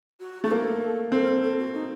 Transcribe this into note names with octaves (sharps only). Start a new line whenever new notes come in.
F#4
A3 F#4
A#3 A4
C4 A4
A#4
A4
A4
F#4
D#4